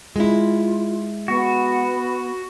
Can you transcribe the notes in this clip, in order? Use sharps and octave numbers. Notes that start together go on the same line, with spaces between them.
G#3 E4 F4
B3 F#4